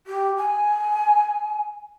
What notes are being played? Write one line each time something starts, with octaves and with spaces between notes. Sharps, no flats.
G4
G#5